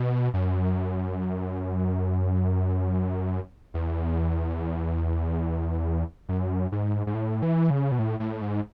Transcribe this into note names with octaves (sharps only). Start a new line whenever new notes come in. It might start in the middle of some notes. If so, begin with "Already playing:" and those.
Already playing: B2
F#2
E2
F#2
G#2
G#2
A2
E3
C#3
B2
A2
A2
G#2